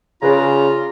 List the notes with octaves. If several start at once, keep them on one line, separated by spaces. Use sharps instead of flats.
C#3 F4 G#4 B4 D5 A#5